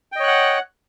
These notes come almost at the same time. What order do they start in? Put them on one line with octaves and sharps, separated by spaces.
G5 D#5 C#5 F#6 F#5